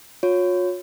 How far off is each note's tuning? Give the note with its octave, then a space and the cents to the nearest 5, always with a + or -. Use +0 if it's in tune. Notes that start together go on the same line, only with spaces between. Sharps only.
F4 +45 C#5 +0